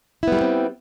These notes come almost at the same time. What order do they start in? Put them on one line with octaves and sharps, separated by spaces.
E4 B3 G3 A3 C4